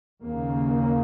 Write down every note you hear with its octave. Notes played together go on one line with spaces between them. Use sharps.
D#2 C#3 A#3